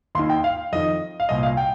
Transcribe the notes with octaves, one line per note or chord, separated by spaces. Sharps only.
D#2 D#3 C6
G5
F5
F2 D#3 D#5
F5
C2 A#2 D#5
F5
G5